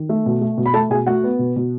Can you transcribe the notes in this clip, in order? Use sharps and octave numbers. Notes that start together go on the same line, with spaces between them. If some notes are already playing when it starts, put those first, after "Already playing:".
Already playing: D#3
A3
B2
A3
B2
B5
A3 A4 A5
B2 G#4 G#5
A3 F#4 F#5
B3
B2
B2